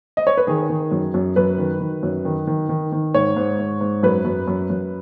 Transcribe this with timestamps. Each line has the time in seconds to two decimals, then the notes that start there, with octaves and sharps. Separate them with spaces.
0.17 D#5
0.27 C#5
0.37 B4
0.47 D#3 G#4
0.70 D#3
0.91 F#2
1.14 F#2
1.36 F#2 B4
1.58 D#3
1.80 D#3
2.03 F#2
2.25 D#3
2.47 D#3
2.69 D#3
2.92 D#3
3.14 G#2 C#5
3.36 G#2
3.59 G#2
3.81 G#2
4.03 F#2 B4
4.25 F#2
4.48 F#2
4.70 F#2